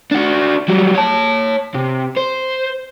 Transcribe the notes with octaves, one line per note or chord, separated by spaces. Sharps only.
D4 F#4
F#3 G3
C#5 A5
C3
C5